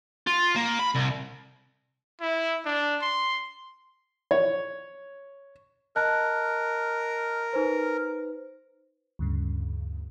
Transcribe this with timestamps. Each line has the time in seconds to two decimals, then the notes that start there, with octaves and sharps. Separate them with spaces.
0.27 F4
0.56 A#3
0.79 B5
0.95 C2
2.21 E4
2.66 D4
3.02 C6
4.31 C#5
5.96 A#4 D#5 A5 F#6
7.53 D#4 B4 C5
9.19 D2 G2 C#3